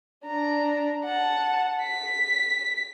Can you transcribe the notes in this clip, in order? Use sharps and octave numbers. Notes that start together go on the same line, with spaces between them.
D4 A#5
F#5 A5
B6